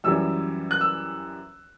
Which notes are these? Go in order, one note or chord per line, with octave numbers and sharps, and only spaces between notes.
F#2 E3 G3 C#4 E4 E6
F#6
E6